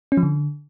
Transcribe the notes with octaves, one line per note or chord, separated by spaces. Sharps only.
C#4
F3
D3